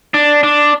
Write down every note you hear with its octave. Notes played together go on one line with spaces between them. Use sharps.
D4
D4